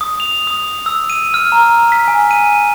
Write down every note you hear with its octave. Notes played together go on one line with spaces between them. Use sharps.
D#6
F7
D#6
E6
D#7
F6
A#5
B6
G#5
D#7